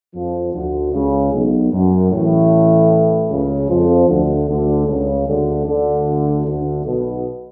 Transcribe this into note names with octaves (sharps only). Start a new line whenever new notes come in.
F2 F3
D2 D3
C#2 C#3
B1 B2
F#2
A1 A2
C#2 C#3
F2 F3
D2 D3
D2 D3
C#2 C#3
D2 D3
D2 D3
D2 D3
B1 B2